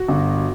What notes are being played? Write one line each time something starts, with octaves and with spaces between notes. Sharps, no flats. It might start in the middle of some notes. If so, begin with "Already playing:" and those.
Already playing: F#4
G1